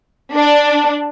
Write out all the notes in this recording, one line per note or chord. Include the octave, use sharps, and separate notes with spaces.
D4